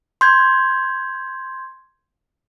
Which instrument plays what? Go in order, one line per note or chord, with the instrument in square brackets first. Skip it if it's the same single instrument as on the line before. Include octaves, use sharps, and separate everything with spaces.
[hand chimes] C6 G6 G#6